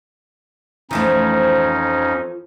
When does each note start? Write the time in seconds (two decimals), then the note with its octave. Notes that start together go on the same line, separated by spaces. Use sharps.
0.91 F2 E3 F3 A3 C#4 D#4